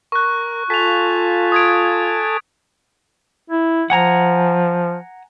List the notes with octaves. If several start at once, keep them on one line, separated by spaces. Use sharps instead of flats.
A#4 C#6 F#6
F4 A4 G#5 A5 B6 F7
D#6 G#6 D7
E4
F3 F#5 G#5 A#5